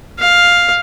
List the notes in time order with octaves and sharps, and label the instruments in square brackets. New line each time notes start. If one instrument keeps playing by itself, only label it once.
[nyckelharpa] F5